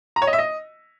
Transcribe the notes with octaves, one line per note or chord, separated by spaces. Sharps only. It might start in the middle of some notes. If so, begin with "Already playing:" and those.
A#5
C#5
D#5
E5
D#5